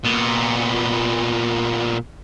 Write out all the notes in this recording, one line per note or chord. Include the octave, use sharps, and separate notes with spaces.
A#2 B3